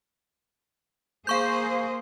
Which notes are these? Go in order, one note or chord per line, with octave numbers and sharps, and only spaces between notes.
A#3 G#4 C5 F5 C#6 G6